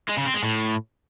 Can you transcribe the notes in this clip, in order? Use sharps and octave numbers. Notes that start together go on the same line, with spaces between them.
G#3
C#3
C4
G#3
A2